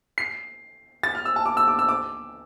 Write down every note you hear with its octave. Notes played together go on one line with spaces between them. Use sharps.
C7
A6
F6
E6
A5
D6
E6
D6
E6
D6